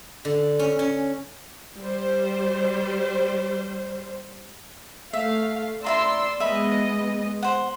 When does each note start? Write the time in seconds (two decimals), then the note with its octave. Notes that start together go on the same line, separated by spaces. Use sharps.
0.25 D3
0.59 C#4
0.79 C#4
1.78 G3 C5
5.13 A3 E5 F5
5.84 E4 F4 D5 A#5 C6 E6
6.40 G#3 B3 D#5 E5 B5
7.43 C5 F#5